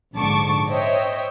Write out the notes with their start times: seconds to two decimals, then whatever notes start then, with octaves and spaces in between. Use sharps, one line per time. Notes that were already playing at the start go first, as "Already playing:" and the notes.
0.14 A#1 G#2 D3 A5 C#6 D6
0.69 C5 C#5 D#5 E5 G5